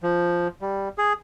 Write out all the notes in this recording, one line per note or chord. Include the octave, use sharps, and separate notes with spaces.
F3
G3
G#4